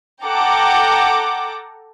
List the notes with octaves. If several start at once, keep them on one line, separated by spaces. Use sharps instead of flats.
A4 F#5 G5 A#5 D6